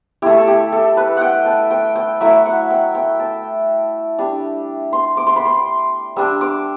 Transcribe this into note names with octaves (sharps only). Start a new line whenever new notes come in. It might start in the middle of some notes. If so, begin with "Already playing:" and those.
A3 E4 G4
A4
G4
A4
B4
F#5 G5
A5
G5
G5
F#3 A3 E4 E5
F#5
G5
G5
A5
G3 D4
C6
D6
C6
B5
C6
G3 D4 E6
D6